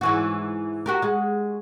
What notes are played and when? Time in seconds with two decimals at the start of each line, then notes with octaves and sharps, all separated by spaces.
0.01 G#2 E3 F#4
0.86 F#4 G4 A#4
1.02 G#3 F#4